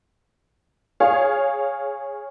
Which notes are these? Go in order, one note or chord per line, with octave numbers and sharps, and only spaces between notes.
G#4 C#5 F5